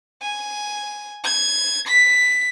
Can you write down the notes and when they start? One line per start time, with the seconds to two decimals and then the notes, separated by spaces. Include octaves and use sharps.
0.22 G#5
1.24 G#6
1.88 B6